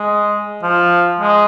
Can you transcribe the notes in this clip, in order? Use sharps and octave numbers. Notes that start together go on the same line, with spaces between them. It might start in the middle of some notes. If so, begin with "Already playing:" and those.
Already playing: G#3
F3
G#3